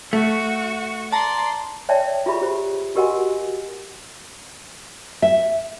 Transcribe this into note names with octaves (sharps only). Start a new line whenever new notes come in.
A3 F#4 C#6
D5 A5 A#5 C6
C#5 D5 E5 G5 A5
F4 G4 G#4 E5 B5
G4 C5
F#4 G4 A#4 D#5 F#5 G#5
E5